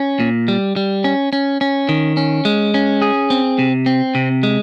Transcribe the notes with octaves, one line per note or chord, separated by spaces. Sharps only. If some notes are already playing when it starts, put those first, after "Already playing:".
Already playing: C#4
A#2
G3
G3
C#4
C#4
C#4
D#3
C#4
G#3
C#4
G#4
C4
C3
C4
C3
G#3